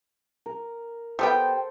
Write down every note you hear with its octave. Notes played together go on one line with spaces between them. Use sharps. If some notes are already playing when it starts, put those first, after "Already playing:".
A#4
G3 B3 A4 C5 G5 A#5